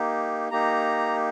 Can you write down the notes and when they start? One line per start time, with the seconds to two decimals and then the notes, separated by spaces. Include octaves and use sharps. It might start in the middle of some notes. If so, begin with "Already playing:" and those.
Already playing: A#3 D#4 G4
0.51 A#3 D#4 G4 A#5